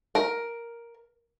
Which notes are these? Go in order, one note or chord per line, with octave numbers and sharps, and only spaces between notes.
A#4